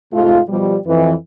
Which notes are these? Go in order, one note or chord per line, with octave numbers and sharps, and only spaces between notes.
G#2 C3 A3 F4
B2 F3 G3
F2 E3